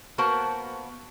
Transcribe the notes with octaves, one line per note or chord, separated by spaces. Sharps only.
A#3 B3 F#4 A#4 C5 A5